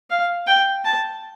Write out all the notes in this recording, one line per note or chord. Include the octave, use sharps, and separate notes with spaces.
F5
G5
A5